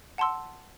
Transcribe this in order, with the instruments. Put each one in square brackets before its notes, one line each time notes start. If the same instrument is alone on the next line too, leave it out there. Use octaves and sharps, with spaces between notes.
[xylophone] F#5 A5 C6 E6